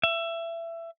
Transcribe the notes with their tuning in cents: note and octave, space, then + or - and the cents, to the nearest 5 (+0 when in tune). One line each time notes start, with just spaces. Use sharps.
E5 +20